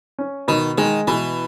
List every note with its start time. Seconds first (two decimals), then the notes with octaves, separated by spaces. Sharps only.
0.19 C#4
0.48 B2 D#3
0.78 D#3 G#3
1.07 B2 E3